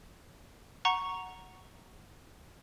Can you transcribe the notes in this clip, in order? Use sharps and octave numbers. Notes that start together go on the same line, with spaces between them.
F#5 A#5 C#6